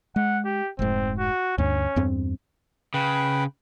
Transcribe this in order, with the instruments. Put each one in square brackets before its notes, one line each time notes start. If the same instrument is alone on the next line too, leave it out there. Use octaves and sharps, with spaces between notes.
[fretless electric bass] G#3 [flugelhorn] F#5
[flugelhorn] G4
[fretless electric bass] F1 G#2 [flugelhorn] C4
[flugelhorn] F#4
[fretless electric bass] D2 G2 [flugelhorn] C#4
[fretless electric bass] E2 G2 C4
[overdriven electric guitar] C#3 [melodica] B4 G5 B5